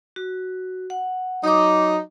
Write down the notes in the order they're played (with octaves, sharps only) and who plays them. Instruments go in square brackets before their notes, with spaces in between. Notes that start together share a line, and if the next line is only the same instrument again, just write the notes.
[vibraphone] F#4
F#5
[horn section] F#3 D#4 [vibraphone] D6 D#6